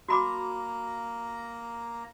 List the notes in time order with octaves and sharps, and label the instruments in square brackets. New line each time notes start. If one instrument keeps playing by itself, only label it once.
[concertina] A#3 A#5 [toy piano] F#4 B5 D6